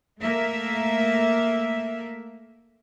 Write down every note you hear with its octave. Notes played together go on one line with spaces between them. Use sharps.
A3 A#3 E5